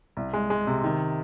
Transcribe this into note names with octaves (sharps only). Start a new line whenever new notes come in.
C2
G#3
G#3
C3
D#3